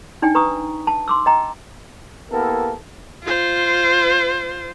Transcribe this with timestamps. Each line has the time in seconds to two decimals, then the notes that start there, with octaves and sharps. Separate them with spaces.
0.22 D4 D#4 D5 G5 G#5
0.35 B4 A#5 C#6 D#6
0.87 A5
1.08 C6 D6 E6
1.26 D#5 G5 A#5
2.31 A#3 B3 E4 G4 A4 A#4
3.24 F4 C5